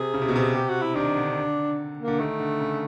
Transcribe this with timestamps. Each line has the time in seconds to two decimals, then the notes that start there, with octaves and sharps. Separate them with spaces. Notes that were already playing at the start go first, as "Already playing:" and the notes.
Already playing: C3 G#4
0.14 C#3
0.22 C3
0.28 B2
0.36 C3
0.55 G4
0.69 F#4
0.82 E4
0.95 D#3 D4
1.17 D3
1.99 A#3
2.08 D3
2.19 D#3 A3
2.40 D3
2.60 C#3